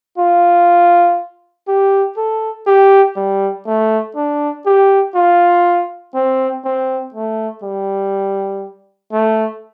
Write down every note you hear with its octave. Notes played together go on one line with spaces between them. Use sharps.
F4
G4
A4
G4
G3
A3
D4
G4
F4
C4
C4
A3
G3
A3